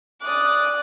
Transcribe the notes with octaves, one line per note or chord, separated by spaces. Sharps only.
D5 D6 D#6 F#6